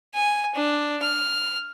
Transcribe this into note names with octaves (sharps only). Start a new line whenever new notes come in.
G#5
D4
F6